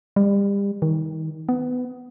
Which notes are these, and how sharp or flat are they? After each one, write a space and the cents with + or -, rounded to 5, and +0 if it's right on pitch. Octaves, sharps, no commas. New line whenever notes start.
G3 +35
D#3 +30
B3 +20